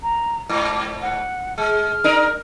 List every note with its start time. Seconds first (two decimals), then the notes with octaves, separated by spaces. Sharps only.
0.03 A#5
0.49 G#2 D6
1.02 F#5
1.58 G#3 F6
2.04 D4 D#4 A#4